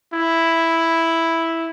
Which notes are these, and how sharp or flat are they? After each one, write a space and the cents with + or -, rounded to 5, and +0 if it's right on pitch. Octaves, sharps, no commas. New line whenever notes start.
E4 +0